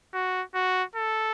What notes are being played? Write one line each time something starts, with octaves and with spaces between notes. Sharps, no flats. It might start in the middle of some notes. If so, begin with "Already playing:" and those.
F#4
F#4
A4